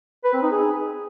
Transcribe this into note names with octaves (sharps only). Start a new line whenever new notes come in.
B4
C4
D#4
G#4